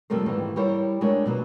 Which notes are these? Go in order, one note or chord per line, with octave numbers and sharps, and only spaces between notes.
F2 C3 G3 A3 A#4 C5
G#2 D#3 E3 A#3
G3 E4 G4 A#4 C5 C#5
G#3 A3 D4 F4 A#4 C#5
B2 F#3 A#3